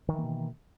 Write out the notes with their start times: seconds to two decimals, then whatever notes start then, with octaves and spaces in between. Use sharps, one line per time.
0.08 D#3
0.13 E3
0.18 A#3
0.23 B2